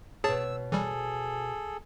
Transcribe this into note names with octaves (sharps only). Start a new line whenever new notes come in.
B2 G#4 C#5 A5 E6 A6
E3 G3 G#4 A4